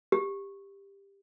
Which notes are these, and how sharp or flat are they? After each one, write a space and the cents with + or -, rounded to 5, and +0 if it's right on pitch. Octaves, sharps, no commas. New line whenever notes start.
G4 +15